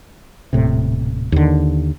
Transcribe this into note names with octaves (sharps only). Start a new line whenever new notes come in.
D#1 A2 C3
D#2 D3